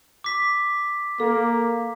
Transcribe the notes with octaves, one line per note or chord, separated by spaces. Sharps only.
D6 B6
A#3 A4